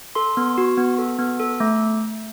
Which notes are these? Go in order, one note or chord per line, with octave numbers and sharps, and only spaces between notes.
A4 C6
B3
F#4
B3
A4
B3
A4
A3